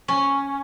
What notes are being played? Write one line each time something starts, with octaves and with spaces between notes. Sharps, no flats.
C#4